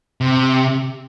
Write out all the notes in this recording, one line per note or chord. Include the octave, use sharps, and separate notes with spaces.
C3